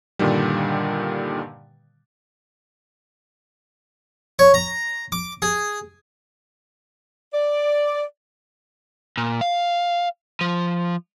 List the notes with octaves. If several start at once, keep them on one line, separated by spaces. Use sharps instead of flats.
G2 A#2 D3 D#3 G3
C#5
A#5
D6
G#4
D5
A#2
F5
F3